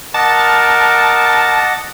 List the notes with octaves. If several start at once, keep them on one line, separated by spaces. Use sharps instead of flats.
A#4 D#5 F#5 A5 D6